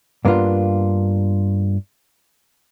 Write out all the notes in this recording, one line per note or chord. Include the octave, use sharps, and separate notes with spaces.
G2 A#3 B3 D4 F4